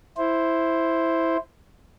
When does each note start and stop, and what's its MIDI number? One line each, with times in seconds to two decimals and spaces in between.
0.17 1.37 64
0.17 1.37 72